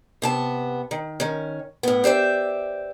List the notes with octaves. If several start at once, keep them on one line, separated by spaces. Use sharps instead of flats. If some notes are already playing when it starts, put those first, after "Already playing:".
C3 B3 A5
D#3
D#3 C#4
A2 B3
G4 C5 D5 E5